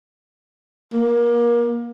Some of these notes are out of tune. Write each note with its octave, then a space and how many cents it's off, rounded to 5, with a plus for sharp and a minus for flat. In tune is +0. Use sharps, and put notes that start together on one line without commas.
A#3 +25